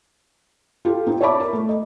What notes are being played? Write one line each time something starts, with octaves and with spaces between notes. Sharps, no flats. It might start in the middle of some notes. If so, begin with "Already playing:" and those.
F4 G4 A4
C4 D#4 E4
C#5 D5 E5 A5 B5 D6
A#4
A3
D#5